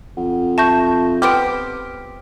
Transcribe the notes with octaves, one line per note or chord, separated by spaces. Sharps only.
F2 F#5
E5 A5 C#6 G6 A#6
B3 C4 G4 F6 D7